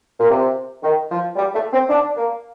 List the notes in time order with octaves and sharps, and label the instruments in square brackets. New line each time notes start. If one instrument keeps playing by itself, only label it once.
[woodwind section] A#2
C3
D#3
F3
G3
A3
C4
D4
A#3